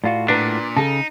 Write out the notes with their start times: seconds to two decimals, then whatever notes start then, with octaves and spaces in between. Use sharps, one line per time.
0.04 A2 F4 F#4 D5 F5
0.28 A#2 D4 B4 A#5
0.76 C#3 D#4 A4 A5